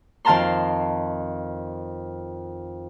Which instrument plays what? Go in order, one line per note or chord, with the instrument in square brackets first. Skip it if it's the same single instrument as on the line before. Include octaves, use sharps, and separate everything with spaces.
[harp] F2 D#3 F5 A5 A#5 C6